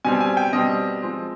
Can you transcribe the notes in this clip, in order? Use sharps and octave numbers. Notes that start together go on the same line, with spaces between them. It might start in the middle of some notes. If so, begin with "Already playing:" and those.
B2 G3 C4 G#5
G#5
G5
B2 G3 C4 D#5
F3 G#3 C4